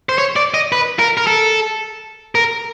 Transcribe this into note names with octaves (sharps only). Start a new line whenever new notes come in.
C5
C#5
D5
D#5
B4
A#4
A#4
A4
A#4